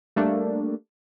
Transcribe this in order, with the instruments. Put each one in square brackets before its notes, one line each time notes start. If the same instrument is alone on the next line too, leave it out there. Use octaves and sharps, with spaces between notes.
[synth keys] G3 A3 A#3 D4